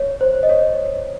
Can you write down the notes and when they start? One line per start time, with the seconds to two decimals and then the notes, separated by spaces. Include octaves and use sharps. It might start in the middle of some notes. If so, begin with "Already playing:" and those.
Already playing: C#5
0.21 C5
0.43 D#5
0.49 C#5